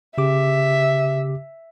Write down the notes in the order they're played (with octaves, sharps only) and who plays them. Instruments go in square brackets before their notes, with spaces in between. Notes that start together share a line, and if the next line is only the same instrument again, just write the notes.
[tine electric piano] C#3 G4 D6 [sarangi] E5